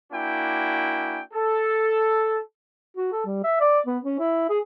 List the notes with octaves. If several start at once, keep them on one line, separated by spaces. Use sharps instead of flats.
A#3 D4 E4 F#4 G5 G#5
A4
F#4
A4
G3
E5
D5
B3
C#4
E4
G#4